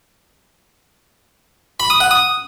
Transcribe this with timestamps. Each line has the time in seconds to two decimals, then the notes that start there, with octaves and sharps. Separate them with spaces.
1.80 B5
1.90 D#6
2.00 F#5
2.11 D#6